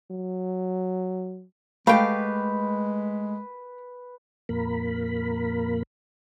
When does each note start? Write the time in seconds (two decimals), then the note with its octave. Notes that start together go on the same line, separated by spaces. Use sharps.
0.11 F#3
1.87 G#3 A3 G4 B4 F5 G5
4.49 F2 A#2 A#3 A#4 B5